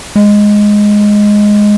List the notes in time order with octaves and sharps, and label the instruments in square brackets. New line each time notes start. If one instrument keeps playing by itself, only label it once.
[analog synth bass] G#3